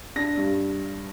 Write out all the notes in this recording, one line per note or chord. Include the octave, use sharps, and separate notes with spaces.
D4 A#6
G2